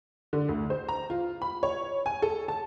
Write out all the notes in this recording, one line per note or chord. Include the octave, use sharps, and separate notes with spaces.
D3
D2
C5
A#5
F4
B5
C#5
G#5
A4
A5